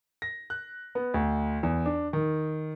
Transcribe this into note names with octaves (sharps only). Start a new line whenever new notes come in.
A#6
F#6
B3
D2
E2
D4
D#3